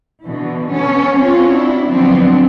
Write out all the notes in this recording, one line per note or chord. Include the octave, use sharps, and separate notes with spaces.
B2 D3 E3
B3 C#4 A4
C4 C#4 F4 F#4 C#5
D4 E4
D3 F3 F#3 B3 C4 D4